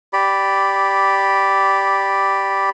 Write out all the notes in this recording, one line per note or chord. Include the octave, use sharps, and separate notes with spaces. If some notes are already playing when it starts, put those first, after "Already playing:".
G4 D5 B5